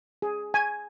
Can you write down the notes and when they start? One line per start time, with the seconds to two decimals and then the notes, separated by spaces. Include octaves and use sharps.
0.22 G#4
0.54 G#5